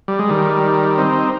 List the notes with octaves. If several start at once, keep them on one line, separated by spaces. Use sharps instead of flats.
G3
G#3
D#3 G3
C4 D#4